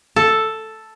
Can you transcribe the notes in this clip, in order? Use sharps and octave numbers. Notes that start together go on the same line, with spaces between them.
A4